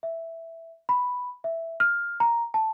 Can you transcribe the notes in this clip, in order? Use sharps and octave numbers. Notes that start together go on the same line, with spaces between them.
E5
B5
E5
F6
A#5
A5